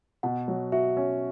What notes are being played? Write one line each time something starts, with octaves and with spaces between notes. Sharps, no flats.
B2 F#5
F#3
F#4 E5
C#4